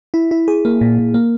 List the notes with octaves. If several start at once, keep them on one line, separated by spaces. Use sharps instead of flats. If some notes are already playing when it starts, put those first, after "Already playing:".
E4
E4
G#4
A#3
A#2
A#2
A#3